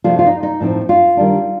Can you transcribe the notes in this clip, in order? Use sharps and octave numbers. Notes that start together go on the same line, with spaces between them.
C3 F3 A3 D4 F4
F4
D#4
D#4
A2 F3 C4 D#4
F4
D#3 G3 D4